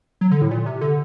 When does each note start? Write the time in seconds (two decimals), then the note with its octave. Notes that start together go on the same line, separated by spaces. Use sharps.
0.21 F#3
0.31 D3
0.42 A2
0.51 A#2
0.66 C3
0.81 D3